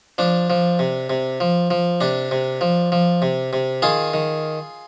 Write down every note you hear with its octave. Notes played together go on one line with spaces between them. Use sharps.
F3 D4
F3
C3
C3
F3
F3
C3 D4
C3
F3
F3
C3
C3
D#3 F4 G#4
D#3